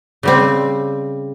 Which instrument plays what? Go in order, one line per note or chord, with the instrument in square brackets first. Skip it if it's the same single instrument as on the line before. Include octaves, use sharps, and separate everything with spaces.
[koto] C#3 G3 C4